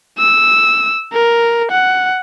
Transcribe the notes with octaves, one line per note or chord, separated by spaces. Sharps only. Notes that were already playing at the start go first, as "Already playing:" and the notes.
E6
A#4
F#5